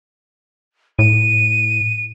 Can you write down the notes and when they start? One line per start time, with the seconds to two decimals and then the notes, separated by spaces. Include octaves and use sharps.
0.99 A2 D#7